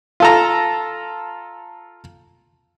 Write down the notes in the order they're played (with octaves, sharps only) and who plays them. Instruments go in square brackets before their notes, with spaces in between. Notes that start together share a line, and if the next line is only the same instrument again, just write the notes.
[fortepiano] F4 A4 A#5